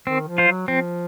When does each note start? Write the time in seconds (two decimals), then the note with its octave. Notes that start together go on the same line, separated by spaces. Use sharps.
0.07 D#3 C4
0.28 F3
0.38 F4 C5
0.48 F#3
0.68 F3 C4